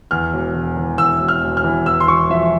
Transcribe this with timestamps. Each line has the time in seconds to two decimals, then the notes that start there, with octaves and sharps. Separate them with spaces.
0.11 E2 F6
0.33 E1
0.54 E1
0.77 E3
0.98 E2 E6
1.21 E1
1.28 F6
1.42 E1
1.57 F6
1.64 E3
1.86 E2 E6
2.00 C6
2.08 E1 C#6
2.30 F3 E5